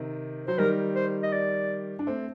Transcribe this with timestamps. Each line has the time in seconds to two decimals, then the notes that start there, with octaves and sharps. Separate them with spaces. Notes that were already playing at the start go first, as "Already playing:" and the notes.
Already playing: C3 D#3
0.47 F#3 C5
0.58 D#3 G3 A#4
0.95 C5
1.23 D#5
1.33 D5
1.99 D4
2.07 A3 C4